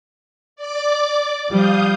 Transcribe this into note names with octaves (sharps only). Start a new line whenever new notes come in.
D5 D6
F3 G3 F5 D#6 G6